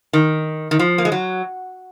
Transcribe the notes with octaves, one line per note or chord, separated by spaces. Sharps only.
D#3
D#3
F3
A#3
G#3
F#3